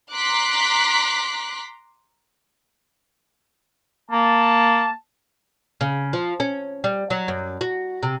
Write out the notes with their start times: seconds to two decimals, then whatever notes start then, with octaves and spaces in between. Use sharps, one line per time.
0.14 A#5 C6 D6 F#6 B6
4.11 A#3 A5
5.81 C#3
6.13 F3
6.40 C#4
6.84 G3
7.10 F#3
7.28 F#2
7.61 F#4
8.03 C3